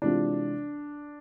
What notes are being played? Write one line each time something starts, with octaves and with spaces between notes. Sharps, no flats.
C3 E3 G#3 C4 D4 F4